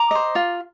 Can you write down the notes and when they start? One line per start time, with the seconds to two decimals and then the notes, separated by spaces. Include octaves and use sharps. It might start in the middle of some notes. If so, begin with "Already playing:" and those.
Already playing: A#5 D6
0.11 C5 D#5
0.35 F4